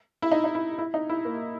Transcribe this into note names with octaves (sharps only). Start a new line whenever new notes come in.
E4
D#4
D#4
E4
E4
D#4
E4
A#3